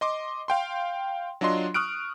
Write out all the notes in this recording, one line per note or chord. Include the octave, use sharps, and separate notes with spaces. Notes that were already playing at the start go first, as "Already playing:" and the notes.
D#5 C6 D6
F5 G5 C6
F#3 D4 F4 D#5 C6
C#6 D#6 F6 F#6 D7